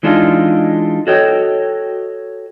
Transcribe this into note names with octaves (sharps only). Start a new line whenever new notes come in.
E3 G#3 D4 D#4 F4
F#4 A4 C#5 D#5 G5